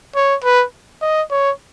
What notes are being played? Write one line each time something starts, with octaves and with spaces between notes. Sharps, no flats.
C#5
B4
D#5
C#5